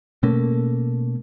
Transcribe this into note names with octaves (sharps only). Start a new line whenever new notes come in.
B2 A3 A#3 C#4